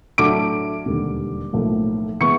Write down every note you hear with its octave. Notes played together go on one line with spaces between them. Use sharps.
A2 F#3 A3 D4 D6 D7
E1 D#2 D3 G3
B1 A2 F3 A#3
E3 G#3 B3 C#6 C#7